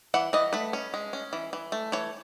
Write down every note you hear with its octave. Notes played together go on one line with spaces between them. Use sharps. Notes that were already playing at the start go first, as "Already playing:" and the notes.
E3 F#5
E3 D#5
A3 B4
C#4
G#3
C#4
E3
E3
A3
E3 C#5